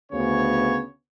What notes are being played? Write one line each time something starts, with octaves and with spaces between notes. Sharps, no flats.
D2 C#3 B3 C#4 C#5